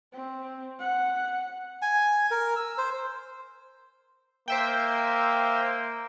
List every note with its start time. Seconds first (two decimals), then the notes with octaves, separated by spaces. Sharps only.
0.13 C4
0.79 F#5
1.82 G#5
2.31 A#4
2.56 E6
2.78 C5
4.48 A#3 C5 E5 G5